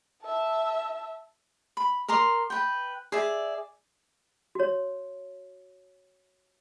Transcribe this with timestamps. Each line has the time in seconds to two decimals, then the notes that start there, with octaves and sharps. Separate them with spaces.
0.23 E5 A5
1.77 B5
2.08 A#4 A#5 C6 D6
2.50 B4 G5
3.12 G#4 D5 E5
4.55 F#4 C#5